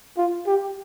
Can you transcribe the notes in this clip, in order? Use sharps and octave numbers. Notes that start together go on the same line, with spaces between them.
F4
G4